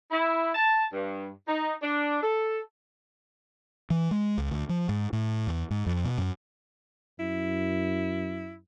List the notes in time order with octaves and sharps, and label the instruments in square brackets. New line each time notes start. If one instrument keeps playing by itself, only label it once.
[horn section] E4
A5
G2
D#4
D4
A4
[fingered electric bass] E3
G#3
C#2
D2
F3
G#2
A2
E2
G#2
F2
B2
F#2
[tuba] F#2 [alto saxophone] E4